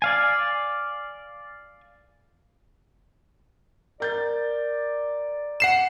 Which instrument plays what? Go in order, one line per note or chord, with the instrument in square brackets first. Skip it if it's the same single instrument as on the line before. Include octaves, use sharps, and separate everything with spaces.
[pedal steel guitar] D5 F5 G#5
[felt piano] A#4 G6 A6 [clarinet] D5
[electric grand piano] F#5 C7 E7